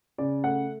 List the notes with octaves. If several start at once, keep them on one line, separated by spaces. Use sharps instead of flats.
C#3 D5
A3 F#5